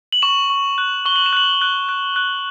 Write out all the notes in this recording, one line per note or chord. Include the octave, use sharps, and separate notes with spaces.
F#7
C#6 E7
C#6
F#6
C#6 G7
F#7
E7
F#6 F#7
F#6
F#6
F#6